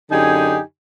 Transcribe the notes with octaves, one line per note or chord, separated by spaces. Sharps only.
F#2 D3 D#4 G4 G#4 G#5